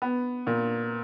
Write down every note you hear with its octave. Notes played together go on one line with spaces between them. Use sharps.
B3
A#2